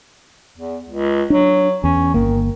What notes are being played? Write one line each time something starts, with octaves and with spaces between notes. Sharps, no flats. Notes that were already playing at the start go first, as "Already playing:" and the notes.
E2
C#2
F#3 D4
E2 C#4
G1 D#3 A#3